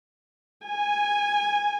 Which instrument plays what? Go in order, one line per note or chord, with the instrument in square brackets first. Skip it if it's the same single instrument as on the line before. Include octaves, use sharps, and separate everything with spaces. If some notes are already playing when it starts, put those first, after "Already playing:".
[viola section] G#5